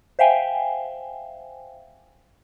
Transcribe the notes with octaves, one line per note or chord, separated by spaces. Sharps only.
C5 E5 F5 G5 G#5